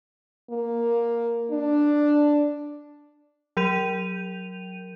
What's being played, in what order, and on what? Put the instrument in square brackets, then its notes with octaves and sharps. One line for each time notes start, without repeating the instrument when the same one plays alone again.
[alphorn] A#3
D4
[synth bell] F#3 A#4 G6 D#7 F7